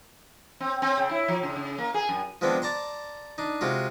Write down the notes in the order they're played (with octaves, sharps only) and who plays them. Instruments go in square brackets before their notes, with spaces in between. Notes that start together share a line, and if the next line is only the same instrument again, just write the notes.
[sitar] C4
C4
C#3
E4
F3
C#3
C#3
A#3
G#4
F#2
[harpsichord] F3 G#3 B3 C4 D4
D5 A5 A#5 C6
D4 D#4
C3 G#3 F4 F#4